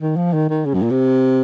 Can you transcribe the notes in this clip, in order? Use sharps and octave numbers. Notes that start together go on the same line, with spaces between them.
D#3
F3
D#3
D#3
C#3
F#2
A#2
C3